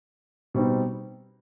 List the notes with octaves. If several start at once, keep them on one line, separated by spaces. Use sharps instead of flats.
B2 G3 C4 D#4